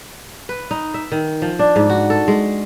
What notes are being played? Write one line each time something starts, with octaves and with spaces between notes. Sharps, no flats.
B4
D#4
E5
D#3
F3
D4
G#2
F#4
A4
G#3